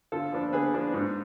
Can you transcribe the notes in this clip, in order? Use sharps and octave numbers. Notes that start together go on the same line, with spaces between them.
D3 F4 A4
F3 B3 D4
D3 G#4 B4
F3 B3 D4
G#2